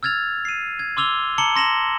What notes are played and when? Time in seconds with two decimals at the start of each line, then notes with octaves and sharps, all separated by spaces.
0.03 E6 F6 G#6 A6 F7
0.45 C7 D#7
0.79 G#6
0.97 C6 D6 E6 F7 G7
1.38 A5 A#5 D6 C#7 F#7 G7
1.55 C6 A#6 E7 F#7